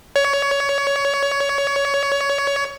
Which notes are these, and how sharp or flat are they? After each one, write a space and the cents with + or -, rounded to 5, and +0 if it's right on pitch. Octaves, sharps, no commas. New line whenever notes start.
C#5 +20